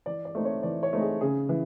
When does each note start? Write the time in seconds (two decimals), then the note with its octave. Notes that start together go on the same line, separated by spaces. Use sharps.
0.06 E3 D5
0.25 D5
0.35 A3 C4 D#4
0.45 C#5
0.63 E3 D5
0.83 C#5
0.93 A3 C4 D#4
1.01 G#4
1.21 C#3 G#4
1.49 E3